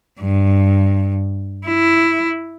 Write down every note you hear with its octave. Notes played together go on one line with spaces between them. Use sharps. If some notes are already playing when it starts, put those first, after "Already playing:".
G2
E4